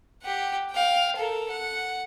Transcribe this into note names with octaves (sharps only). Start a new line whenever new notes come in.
G4 F#5
F5 G5
A4 A#4
F#5